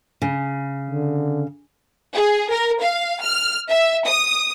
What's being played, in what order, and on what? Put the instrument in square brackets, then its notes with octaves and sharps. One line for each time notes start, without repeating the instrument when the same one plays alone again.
[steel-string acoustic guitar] C#3
[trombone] D3
[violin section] G#4
A#4
F5
F6
E5
D#6